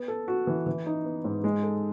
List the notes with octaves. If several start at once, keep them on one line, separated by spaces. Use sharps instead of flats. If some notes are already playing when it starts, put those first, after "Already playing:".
Already playing: B3
A4
F#4
E3
E3
D#4
B3
G#2
G#3
A4